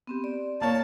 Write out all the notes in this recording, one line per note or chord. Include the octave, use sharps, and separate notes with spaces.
B3 C4 G4
D5
A#3 C#5 A5